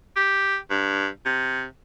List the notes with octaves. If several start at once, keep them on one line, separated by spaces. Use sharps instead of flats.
G4
G2
C3